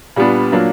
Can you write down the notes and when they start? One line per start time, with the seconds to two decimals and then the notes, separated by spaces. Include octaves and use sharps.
0.16 A#2 G3 B3 D4
0.52 A#2 F#3 A#3 D4